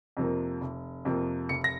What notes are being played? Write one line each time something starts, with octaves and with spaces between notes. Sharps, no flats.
F2 C3 F3 A#3
F1
F2 C3 F3 A#3
F1 C#7
A#6